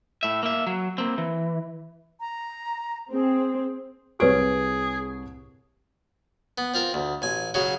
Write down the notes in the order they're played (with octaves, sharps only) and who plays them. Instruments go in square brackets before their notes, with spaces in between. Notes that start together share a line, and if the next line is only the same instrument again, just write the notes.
[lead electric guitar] A2 E5
A#3 E5
F#3
A#3 C4
E3
[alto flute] A#5
[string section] C4 [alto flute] G#4
[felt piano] C2 C#5 D7 [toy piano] G4 B4 [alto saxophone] G#4
[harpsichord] B3
C4 F4 A#4
D2
A1 G#5
C#3 F#3 F5 C#6